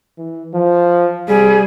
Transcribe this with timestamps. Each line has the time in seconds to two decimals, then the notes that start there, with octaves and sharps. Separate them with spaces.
0.18 E3
0.54 F3
1.28 C3 G3 G#4